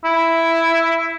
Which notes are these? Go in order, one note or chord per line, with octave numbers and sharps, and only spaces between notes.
E4